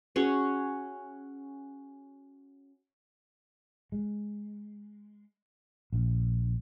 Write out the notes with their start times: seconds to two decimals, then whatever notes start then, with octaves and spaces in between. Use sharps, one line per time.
0.16 C#4 F#4 G#4 F#5
3.92 G#3
5.93 A#1